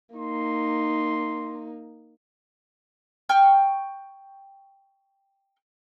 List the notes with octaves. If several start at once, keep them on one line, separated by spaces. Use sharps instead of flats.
A#3 D#4 C6
G5 C#6 F6